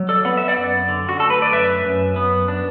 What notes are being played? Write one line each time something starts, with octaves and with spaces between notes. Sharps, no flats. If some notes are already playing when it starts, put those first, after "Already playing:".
Already playing: F#3
A4 D5
B3 F#5
E5
D5 F#5
F#2
D3
F#4
A3 A4
B4
D5
F#2 B4 E5
F#2
B3
D4